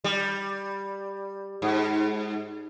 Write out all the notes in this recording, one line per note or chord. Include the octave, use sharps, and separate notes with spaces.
G3
G#2